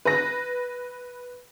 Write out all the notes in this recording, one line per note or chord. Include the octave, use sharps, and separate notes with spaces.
B4 A#6